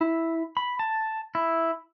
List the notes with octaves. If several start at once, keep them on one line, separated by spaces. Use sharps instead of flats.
E4
B5
A5
E4